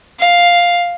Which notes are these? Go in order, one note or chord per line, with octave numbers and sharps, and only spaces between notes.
F5